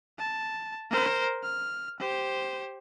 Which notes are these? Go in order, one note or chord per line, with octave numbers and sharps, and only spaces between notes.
A5
A#4 C5
F6
G4 C5